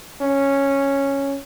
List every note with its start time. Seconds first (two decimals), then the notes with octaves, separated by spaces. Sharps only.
0.21 C#4